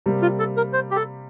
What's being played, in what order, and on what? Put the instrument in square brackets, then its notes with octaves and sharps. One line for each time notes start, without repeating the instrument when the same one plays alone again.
[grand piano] C3 G3 A#3
[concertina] F4
A4
A#4
C5
G4
A4